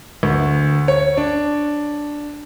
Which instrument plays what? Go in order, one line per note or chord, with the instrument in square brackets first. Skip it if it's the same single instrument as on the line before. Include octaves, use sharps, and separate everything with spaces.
[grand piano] D2
C#5
D4